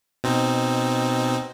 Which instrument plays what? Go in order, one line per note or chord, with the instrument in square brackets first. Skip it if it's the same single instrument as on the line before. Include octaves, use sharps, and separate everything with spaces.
[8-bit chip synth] B2 C4 D#4